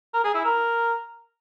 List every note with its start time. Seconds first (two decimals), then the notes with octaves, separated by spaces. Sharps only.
0.14 A#4
0.24 G#4
0.34 E4
0.44 A#4